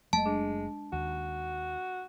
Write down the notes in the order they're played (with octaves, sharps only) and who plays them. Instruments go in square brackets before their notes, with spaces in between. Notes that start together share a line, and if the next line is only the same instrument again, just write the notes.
[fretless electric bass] F#1 F#3 A3 [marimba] G#3 D#5 [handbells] A5
[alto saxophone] G#3 [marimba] D4
[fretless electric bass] D#2 [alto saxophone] F#4